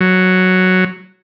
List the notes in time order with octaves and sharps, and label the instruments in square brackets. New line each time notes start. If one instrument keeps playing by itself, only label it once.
[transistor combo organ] F#3